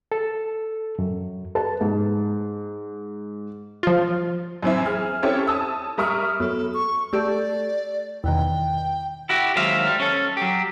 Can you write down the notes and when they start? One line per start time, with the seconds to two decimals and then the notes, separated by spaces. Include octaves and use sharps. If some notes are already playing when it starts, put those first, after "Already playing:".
0.12 A4
0.99 F#2
1.55 B4 A5
1.81 G#2
3.83 F3 F4
4.63 F#2 E3 C4 E4
4.86 G#4 F6
5.22 C4 C#4 E4 G4 A4 C#5
5.47 A5 D#6 E6
5.98 G3 A#4 E5 C#6 D#6 F6
6.40 F#2 B3 A4
6.74 C#6
7.13 A3 G4 A4 D5
8.24 E2 B2 D#3 G5
9.29 E4 F#4 G4
9.56 D#2 F#3 G#3 C5 E5 F5
9.87 G3
10.00 C#4 A4
10.37 F#3 G4